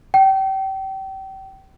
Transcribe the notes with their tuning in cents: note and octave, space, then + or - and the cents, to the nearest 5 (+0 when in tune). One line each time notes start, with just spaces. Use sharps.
G5 -30